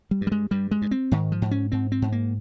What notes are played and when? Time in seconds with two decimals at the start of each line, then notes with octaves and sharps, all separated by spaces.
0.11 G3
0.21 G2
0.27 G3
0.32 G#3
0.51 G2 G3
0.71 G#3
0.82 G2
0.91 C4
1.11 G#2 D#3
1.32 F3
1.42 G#2
1.51 C#4
1.72 G#2 C4
1.92 C4
2.02 G#2
2.12 A#3